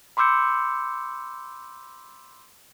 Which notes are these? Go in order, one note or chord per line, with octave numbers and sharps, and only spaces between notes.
B5 C6 D6 E6 G6 C#7